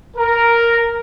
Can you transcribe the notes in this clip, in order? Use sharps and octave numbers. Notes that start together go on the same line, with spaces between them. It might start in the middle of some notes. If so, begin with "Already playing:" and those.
A#4